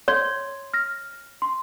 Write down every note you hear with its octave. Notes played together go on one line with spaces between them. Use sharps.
C#5 C6 G#6
F6 A#6
C6